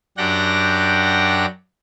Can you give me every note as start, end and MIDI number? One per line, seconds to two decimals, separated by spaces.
0.17 1.46 42
0.17 1.46 62
0.17 1.46 67
0.17 1.46 78
0.17 1.46 79
0.17 1.46 94